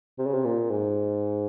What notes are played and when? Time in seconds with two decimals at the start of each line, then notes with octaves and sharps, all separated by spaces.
0.18 C3
0.26 C#3
0.34 C3
0.44 A#2
0.70 G#2